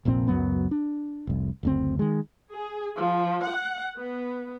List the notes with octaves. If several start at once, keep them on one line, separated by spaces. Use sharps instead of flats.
F1 A#1 A#2 C4
C#2 F#2 F#3 B3
D4
F1 C2
F#1 D2 C4
D#3 G#3
G#4
F3
F#5
B3